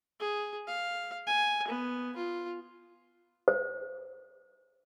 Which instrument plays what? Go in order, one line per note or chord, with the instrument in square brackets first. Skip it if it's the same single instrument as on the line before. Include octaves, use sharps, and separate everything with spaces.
[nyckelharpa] G#4
F5
G#5
B3
F4
[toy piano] C5